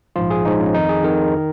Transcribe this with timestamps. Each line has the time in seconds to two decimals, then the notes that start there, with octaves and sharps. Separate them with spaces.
0.16 A#1 G#2 F3 F4
0.31 G#4
0.45 A#1 G#2 F3 D#4
0.60 C#4
0.75 F2 D#3 D#4
0.89 G#4
1.04 F2 D#3 A#4
1.37 D#3